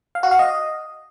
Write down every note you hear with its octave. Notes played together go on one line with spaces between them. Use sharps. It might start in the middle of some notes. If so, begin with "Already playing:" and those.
F5
F#4
F5
D#5